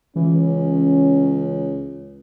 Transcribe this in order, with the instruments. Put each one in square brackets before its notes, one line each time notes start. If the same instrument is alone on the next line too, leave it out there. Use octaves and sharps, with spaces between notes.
[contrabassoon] C#2 [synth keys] E3 [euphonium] C#4